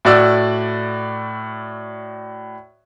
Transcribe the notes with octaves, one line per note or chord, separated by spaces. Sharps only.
A2 F#4 D5 E6